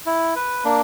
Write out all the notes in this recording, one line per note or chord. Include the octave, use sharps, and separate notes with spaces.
E4
B4
A#3 D4